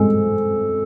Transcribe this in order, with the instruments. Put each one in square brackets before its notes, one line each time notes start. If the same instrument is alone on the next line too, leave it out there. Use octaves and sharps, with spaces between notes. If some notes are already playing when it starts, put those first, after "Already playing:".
Already playing: [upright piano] G#3 C4 [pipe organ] A4